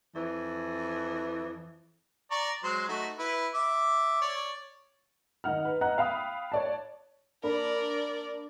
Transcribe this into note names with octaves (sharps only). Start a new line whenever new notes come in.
F2 E3
D5 A#5 C#6
F#3 G#3 C5
A3 D#4 F#4
E4 B4
E5 D6
C#5 D5
D#3 D#4 F#5 F6
B4
D#5 F#5 A#5 F#6
F5 G5 B5 D#6
C#5 D5 A5
A#3 D4 A#4 D5 B5